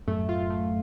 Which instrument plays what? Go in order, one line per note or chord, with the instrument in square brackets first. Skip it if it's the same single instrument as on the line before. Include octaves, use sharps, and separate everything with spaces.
[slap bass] F#2 A2 [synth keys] A3
[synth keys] F4
A3